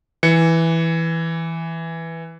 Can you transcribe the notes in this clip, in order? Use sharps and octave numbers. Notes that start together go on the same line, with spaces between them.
E3 C#7